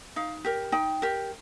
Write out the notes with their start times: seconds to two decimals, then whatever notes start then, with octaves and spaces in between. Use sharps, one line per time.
0.16 D#4 F5
0.45 G4 A#4
0.72 D#4 G5
1.02 G4 A#4